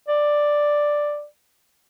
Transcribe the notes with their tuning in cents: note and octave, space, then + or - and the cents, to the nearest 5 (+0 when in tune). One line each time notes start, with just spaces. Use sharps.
D5 +5